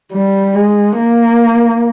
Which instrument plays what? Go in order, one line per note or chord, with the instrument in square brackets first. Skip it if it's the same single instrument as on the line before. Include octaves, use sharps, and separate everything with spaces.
[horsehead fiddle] G3
G#3
A#3